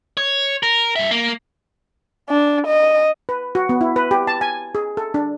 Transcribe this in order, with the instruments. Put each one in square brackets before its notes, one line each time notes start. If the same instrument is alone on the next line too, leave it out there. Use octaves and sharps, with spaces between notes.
[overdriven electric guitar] C#5
A#4
G2 E5
A#3
[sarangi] D4
D#5
[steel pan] B4
F#4
B3
E4
B4
G4
A5
G#5
G#4
A4
D4